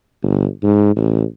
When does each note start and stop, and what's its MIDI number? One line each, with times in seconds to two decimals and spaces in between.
0.23 0.47 31
0.63 0.93 44
0.96 1.24 33